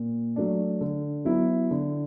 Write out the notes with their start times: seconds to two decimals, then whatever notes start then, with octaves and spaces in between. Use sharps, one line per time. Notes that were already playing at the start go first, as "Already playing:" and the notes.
Already playing: A#2
0.36 F#3 A3 D4
0.81 D3
1.25 F#3 B3 E4
1.71 D3